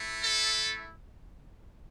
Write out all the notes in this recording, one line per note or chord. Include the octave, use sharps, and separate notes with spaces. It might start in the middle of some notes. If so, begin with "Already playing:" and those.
Already playing: A3 E4
A4